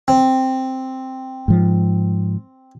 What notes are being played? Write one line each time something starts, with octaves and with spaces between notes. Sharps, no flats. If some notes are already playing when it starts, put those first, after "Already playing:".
C4
G#2 F3